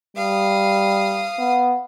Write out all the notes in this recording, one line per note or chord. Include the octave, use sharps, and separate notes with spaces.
G3 F5 D#6
B3